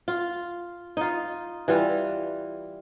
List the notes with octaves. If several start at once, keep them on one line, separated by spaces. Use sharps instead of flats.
F4
D#4 F4
E3 G3 F4